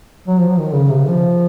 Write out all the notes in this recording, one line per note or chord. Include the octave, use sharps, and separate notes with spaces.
F#3
F3
F#3
D#3
C#3
C3
C#3
F3